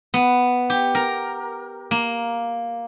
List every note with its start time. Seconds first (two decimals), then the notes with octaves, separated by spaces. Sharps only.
0.14 B3
0.70 G4
0.95 A#4
1.91 A#3